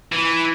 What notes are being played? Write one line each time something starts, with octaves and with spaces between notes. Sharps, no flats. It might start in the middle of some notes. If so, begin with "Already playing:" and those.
E3